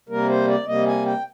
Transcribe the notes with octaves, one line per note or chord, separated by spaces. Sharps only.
C3 G3 A#3 A#4
C5
D5
C3 G3 A#3 D#5
G#5
G5